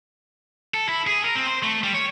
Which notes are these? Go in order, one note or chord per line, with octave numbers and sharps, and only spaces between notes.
A4
E4
G#4
A#4
C4
C5
A3
G3
C#5